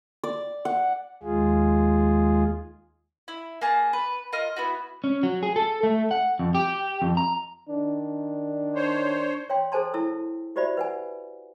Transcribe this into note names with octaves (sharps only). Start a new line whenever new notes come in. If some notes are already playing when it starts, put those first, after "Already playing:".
D5
F#5
D#2 G#3 F4 G#4
E4
A#3 G#4 A5
B4
F4 A#4 D#5 F6
B3 E4 F#4
C#4
F#3
G#4
A4
A3
F#5
F2
G4
F2
A#5
D#3 D4
C5 C#5
C#5 F5 G5 C6
G#4 A4 C5 G#5 A5 C6
E4 A4 A5 E6
F#4 G4 C5 D5 E5 B5
B4 F#5 G#5